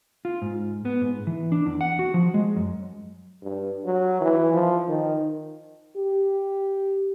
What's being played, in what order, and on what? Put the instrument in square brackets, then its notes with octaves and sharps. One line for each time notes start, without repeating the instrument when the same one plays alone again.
[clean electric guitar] F4
G#2
B3
G#2
E3
D4
E2
F#5
F#4
F3
G#3
F#2
[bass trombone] G2
F#3
E3
F3
D#3
[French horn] G4